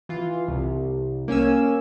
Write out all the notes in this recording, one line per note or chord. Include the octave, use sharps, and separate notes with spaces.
E3 F4
C2
A#3 C#4 G#5 E6